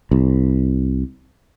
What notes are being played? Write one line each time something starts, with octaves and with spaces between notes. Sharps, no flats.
C2